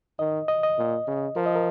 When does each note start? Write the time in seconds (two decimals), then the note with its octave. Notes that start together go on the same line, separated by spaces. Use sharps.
0.19 D#3 D#5
0.48 D#5
0.63 D#5
0.78 A#2
1.07 C#3
1.36 F3 A#4
1.46 D#5
1.56 A#4